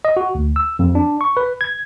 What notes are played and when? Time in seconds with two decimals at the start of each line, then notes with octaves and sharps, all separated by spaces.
0.05 D#5
0.17 F#4
0.35 D2
0.56 E6
0.79 F2
0.95 D4
1.21 C#6
1.37 B4
1.61 G#6